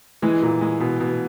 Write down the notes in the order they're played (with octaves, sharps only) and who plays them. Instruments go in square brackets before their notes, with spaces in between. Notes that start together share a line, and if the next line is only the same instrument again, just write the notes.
[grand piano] E3 [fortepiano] G#3
[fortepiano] A#2
G#3
B2
B2